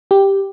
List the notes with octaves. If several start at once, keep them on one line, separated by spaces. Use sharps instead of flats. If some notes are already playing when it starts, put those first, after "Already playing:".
G4